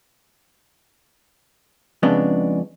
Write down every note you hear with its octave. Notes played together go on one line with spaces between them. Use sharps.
F2 C#3 G#3 B3 D4